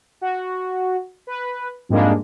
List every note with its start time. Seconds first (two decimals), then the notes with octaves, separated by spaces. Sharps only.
0.21 F#4
1.27 B4
1.89 F2 G#2 G3 G#3 A#3 D4